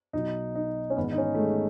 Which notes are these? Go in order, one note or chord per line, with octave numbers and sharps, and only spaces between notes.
B1 B2 F#3 D#4
D#4
C#4
G#1 G#2 E3 B3
D#4
C#4
A3
G#3